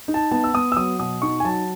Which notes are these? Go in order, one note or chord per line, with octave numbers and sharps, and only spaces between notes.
D#4
A5
B3 A5
E6
B3 D#6
E6
F#3 D#6
B2 D#6
D#4 C#6
G#5
F#3 A5